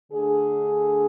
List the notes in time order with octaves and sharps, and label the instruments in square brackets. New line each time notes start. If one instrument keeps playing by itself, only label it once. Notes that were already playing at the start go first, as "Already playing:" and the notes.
[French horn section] D3 A3 D4 G#4